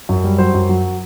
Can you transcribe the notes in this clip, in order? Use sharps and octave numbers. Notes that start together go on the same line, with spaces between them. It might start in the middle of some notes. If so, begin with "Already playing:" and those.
F#2
G3
F#3 C5
F#2
F#3